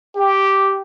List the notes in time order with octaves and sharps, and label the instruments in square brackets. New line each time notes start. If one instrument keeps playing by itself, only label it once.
[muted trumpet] G4